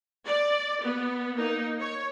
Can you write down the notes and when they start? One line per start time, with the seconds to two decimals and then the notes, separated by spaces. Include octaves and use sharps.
0.25 D5
0.83 B3
1.35 A#3 D#4
1.80 C#5